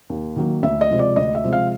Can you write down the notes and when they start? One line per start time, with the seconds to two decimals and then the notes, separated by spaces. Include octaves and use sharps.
0.10 D#2
0.36 D#3 F#3 A#3
0.63 D2 E5
0.81 D#5
0.91 C3 F3 G#3
0.99 D5
1.16 D2 D#5
1.35 E5
1.44 C3 F3 G#3
1.53 F5